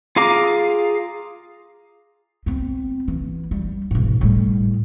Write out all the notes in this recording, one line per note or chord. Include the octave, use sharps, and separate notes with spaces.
F4 G#4 F5 A#5 D6
B3 C4
E3
G3
G#2 B2
A2 G3